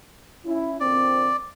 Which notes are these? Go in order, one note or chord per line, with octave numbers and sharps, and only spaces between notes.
C#4 E4
A#2 D3 C4 D5